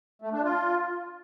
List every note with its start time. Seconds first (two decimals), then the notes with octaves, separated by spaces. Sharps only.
0.22 A3
0.33 D4
0.44 F4